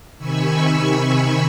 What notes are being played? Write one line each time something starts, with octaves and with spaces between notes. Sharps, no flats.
C3 D#3 G#5 B5 C#6 E6